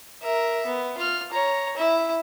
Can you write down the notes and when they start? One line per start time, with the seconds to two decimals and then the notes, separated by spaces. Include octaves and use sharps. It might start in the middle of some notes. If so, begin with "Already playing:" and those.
0.22 A#4 E5
0.66 B3
0.98 F4 F6
1.32 C#5 A#5
1.76 E4 E5